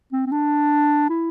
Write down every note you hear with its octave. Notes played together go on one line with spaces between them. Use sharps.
C4
C4
D4
E4